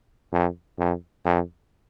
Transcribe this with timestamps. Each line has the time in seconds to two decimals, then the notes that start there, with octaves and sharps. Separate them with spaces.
0.32 F2
0.78 F2
1.25 F2